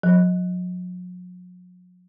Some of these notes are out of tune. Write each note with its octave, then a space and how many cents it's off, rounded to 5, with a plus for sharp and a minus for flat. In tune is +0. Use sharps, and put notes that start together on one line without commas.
F#3 -45